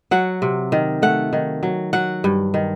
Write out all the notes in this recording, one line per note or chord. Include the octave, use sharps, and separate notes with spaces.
F#3 F#5
C3
D#3
A3 F#5
D#3
F#3
F#3 F#5
G2
D#3